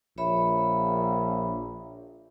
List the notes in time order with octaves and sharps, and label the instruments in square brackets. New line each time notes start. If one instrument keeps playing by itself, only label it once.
[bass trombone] A#1 [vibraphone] C#5 E5 B5